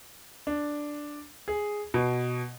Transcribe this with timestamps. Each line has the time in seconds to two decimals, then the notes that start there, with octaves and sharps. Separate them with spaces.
0.47 D4
1.48 G#4
1.94 B2